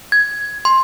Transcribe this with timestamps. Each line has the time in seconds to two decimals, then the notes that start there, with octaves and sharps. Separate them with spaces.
0.12 G#6
0.65 C6